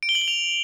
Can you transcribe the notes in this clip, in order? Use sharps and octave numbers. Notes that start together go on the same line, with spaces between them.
D7
G7
F#7
G7
F7